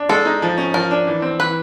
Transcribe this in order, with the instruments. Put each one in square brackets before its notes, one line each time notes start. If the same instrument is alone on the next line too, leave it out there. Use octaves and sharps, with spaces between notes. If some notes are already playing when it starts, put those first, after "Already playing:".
Already playing: [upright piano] D4
[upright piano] G#3 [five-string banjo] A4
[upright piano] D#4
F3
C#4
[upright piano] F3 [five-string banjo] A#4
[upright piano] D4
E3
C4
[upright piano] E3 [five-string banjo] B4